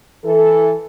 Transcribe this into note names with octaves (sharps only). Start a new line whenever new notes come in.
E3 A4